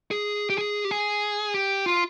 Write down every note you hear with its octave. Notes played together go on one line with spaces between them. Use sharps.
G#4
G4
G#4
G4
G#4
G4
F4